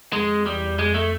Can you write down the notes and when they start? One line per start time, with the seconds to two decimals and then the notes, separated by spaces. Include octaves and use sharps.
0.13 F2 G#3
0.45 E2 G3
0.78 F2 G#3
0.94 A3